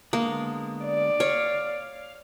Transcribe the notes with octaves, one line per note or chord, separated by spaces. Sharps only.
D3 G#3 A#3 B3
D5
C#5 F5